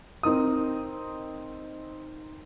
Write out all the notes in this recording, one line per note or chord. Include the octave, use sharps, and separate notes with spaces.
C4 D#4 A#4 D#6